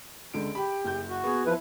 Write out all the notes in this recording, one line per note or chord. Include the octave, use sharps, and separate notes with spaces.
C#2 D3 D7
G4 B5
F#1 G6
F#4
B3 G#4
F2 F3 E4 B4